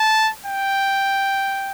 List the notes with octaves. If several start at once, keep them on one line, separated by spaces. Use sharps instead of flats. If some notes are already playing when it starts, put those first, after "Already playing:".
Already playing: A5
G5